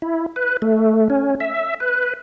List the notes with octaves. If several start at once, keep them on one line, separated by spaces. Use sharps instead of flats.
E4
B4
A3
C#4
E5
B4